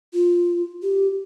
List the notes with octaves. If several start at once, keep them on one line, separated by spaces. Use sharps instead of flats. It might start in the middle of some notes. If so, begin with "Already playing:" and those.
F4
G4